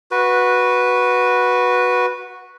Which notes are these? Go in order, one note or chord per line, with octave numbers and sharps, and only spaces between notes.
F#4 B4